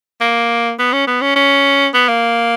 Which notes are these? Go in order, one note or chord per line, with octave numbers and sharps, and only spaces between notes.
A#3
B3
C#4
B3
C#4
C#4
B3
A#3